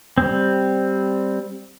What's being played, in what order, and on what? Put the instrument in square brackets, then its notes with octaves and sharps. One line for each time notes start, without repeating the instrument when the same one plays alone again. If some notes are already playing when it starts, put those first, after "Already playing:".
[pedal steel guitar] G3 C4